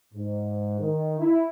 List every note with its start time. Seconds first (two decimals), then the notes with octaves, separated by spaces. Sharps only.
0.14 G#2
0.80 D#3
1.19 E4